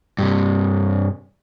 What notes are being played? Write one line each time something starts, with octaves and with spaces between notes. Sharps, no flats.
G2 C3